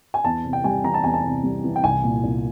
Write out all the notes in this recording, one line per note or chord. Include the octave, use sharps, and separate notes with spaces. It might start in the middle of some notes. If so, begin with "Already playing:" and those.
G#5
E2 A5
C3
G5
G3 G#5
E3 A#5
A5
E2 G#5
A5
C3
G3
E3
G5
C2 G#5
A#2
C2